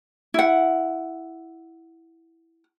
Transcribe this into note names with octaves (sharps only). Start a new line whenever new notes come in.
E4 F#5